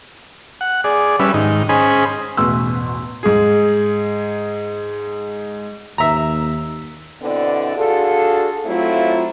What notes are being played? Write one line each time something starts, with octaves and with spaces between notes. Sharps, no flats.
F#5
G#4 D5
G3 C#4 B4 E5
G#2 D#3 D#4
C#4 G#4 C5 D#5 G#5 B5
A1 E2 B2 B4 C6 E6
G#2 G#4
D#2 E5 A#5
B2 D3 B3 C4 E4 D5
D4 F4 F#4 G#4 A4
F#3 A3 C4 E4 F4